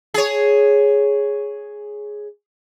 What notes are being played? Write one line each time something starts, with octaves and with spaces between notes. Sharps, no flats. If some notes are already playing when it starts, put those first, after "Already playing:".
G#4 C#5